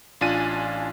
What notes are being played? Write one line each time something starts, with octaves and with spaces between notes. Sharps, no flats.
A1 D4 F4 G#5 A6 D#7